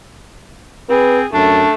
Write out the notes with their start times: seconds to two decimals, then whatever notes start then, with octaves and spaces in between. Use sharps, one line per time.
0.90 C4 G#4 B4
1.34 F#2 A3 D4